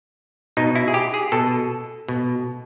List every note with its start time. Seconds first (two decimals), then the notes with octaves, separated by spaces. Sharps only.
0.57 B2 D#4
0.75 E4
0.88 G#4
0.94 G4
1.14 G#4
1.32 B2 A4
2.08 B2